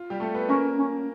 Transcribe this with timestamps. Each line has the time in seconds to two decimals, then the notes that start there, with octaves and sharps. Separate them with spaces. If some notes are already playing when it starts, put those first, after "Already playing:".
Already playing: F4
0.10 G3 G4
0.20 A3 A4
0.35 B3 B4
0.49 A#3 C#4 A#4
0.78 C#4